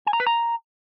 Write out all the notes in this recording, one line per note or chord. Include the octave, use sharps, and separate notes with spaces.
G#5
A#5
B4
A#5